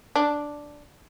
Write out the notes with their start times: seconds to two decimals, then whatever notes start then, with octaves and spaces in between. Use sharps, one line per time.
0.16 D4